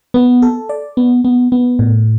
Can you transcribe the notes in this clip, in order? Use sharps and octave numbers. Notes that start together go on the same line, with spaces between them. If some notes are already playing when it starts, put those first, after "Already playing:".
B3
A4
D5
B3
B3
B3
A2